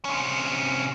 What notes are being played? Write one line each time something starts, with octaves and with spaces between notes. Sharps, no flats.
C3 C#4